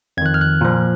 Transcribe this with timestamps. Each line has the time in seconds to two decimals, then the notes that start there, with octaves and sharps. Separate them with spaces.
0.17 F2 G#6
0.22 D#3 F#6
0.34 F6
0.41 F#6
0.61 A#2 F3